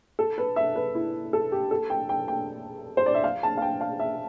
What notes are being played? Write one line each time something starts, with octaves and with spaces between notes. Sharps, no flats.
A4
B4
E5
B4
E4
A4
G4
A4
G5
G5
G5
C5
D5
E5
F5
A5
F5
G5
F5
E5